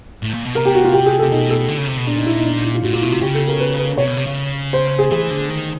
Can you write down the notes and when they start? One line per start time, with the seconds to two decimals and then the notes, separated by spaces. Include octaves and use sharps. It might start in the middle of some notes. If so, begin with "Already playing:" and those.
0.23 A2
0.34 A#2
0.45 B2
0.55 C3 A#4
0.65 G4
0.75 F#4
0.84 F4
0.93 G4
1.06 G#4
1.19 C3 A4
1.31 B2 D#4
1.50 A4
1.68 D3
1.78 C#3
1.88 C3
1.98 B2
2.07 A#2 D4
2.16 D#4
2.26 E4
2.36 D#4
2.45 D4
2.55 D#4
2.64 E4
2.74 F4
2.83 A2 F#4
2.93 A#2 F4
3.02 B2 E4
3.12 C3 F#4
3.21 C#3 G4
3.34 A4
3.47 A#4
3.60 B4
3.79 B4
3.97 C3 C#5
4.07 B2
4.17 C3
4.26 C#3
4.73 C5
4.99 G#4
5.11 E3 G#4
5.31 D3
5.50 D#3